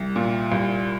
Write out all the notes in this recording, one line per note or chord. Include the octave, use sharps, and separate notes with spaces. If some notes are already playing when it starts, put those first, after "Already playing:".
Already playing: C2
A#2
C2